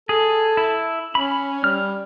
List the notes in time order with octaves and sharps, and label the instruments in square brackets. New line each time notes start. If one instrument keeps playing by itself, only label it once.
[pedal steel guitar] G#4 [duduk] A4
[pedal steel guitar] E4
[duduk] C#4 [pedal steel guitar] B5
[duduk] G3 [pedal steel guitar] F6